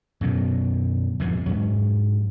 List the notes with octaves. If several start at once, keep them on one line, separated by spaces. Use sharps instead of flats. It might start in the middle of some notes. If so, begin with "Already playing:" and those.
F#2 B2 D3
F2 G#2 B2 D3
G#2 F#3